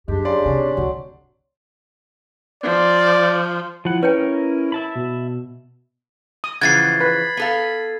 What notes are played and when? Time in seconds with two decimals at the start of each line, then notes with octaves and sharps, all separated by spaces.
0.08 F#2 G#3 D4 G4
0.25 C#3 D5 C6
0.45 C3 C#4
0.77 D2 C3 F#3
2.63 F3 D5
3.85 F3 E4 F#5
4.03 C#4 A#4 B4 C#5 G5
4.72 E5 A5 B5
4.95 B2
6.44 D#6
6.61 C#3 E3 F3 F#5 G#6 A6 C7
7.00 B4 B5
7.37 B3 A4 F5